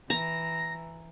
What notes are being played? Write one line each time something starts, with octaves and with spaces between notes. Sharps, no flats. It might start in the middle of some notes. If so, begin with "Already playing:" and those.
E3 A#5 A#6